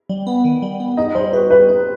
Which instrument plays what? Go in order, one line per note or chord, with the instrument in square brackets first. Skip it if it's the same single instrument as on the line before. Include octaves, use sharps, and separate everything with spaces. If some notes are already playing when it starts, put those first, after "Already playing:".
[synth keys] G3
B3
D#3
G3
B3
[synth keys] D#4 [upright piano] D#5
[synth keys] G3 [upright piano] C5
[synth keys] F#4 [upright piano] B4
[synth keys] G3 [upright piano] B4
[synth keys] D#4